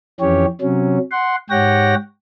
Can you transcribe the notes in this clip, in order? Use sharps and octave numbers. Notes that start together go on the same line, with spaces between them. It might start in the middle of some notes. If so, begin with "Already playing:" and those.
F2 E3 C#4 G4 C#5
C3 F#3 C#4
F#5 C6
G#2 G4 C#5 F#5 G5 A#6